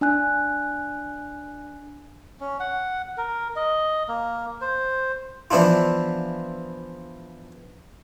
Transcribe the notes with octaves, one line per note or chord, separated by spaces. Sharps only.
D4 G#5 F#6
C#4
F#5
A#4
D#5
A#3
C5
E3 F3 B3 D4 E4 F4